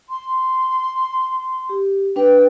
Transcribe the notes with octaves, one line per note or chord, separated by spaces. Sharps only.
C6
G4
D4 B4 G5